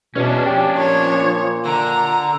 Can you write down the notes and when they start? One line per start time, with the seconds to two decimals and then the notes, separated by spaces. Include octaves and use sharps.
0.15 E2 B2 C#4 D4
0.46 F3 G4
0.78 A#2 C#5
1.66 D3 A#5